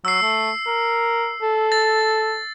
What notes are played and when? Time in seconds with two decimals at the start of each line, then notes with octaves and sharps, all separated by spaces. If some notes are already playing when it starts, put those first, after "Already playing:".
0.05 F#3 E6 C7
0.22 A3
0.67 A#4
1.42 A4
1.72 A6